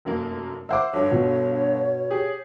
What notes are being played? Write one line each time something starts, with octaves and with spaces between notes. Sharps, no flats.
F1 F#2 A#3
C5 E5 F#5 D6 E6
G1 G2 C#5
B2
G4 G#4